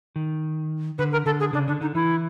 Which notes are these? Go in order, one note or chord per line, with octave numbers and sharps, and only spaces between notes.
D#3
D3 B4
A#4
D3 A4
G#4
C#3 D4
D3 D4
D3 D#4
E3 E4